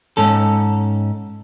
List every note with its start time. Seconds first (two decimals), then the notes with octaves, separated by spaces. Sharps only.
0.17 G#2 C#4 A4